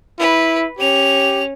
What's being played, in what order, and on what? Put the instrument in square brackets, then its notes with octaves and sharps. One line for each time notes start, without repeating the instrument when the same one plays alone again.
[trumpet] E4 [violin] B4
[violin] C#4 F7 [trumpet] G4